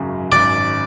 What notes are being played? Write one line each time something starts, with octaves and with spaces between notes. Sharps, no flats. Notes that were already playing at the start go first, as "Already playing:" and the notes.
Already playing: G#1 F#2 C#3 F#3
G#1 D5